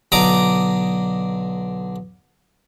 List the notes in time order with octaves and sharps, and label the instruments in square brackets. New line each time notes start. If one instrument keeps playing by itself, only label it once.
[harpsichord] B1 D3 D5 A#5 D6 D#6